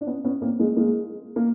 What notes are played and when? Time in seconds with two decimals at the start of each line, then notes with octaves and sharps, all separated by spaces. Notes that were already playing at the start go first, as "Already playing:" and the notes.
0.01 D4
0.07 B3 C#4
0.24 B3 C#4
0.42 A#3 C4
0.59 G#3 A#3
0.77 G#3 A#3
1.36 A#3